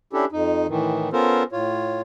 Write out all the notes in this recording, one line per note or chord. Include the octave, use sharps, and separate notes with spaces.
C#4 D4 E4 G4 A4
F2 D#4
A2 D#3 E3
B3 C#4 F4 A4 A#4 C5
A2 F4 C#5